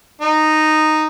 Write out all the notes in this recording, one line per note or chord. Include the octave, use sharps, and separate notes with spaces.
D#4